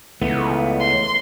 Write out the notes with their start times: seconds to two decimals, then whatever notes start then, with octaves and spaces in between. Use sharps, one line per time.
0.21 C#2 E3 A3 B3
0.80 C6